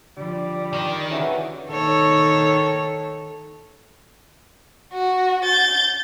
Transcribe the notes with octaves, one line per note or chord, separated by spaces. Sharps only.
D3 F3 G3
D#3
G2 C#3 E3 F#4 F#5
D#3 A4 C#5
F#4
G6 A6